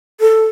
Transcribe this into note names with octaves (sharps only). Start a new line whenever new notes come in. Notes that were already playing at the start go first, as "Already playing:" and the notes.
A4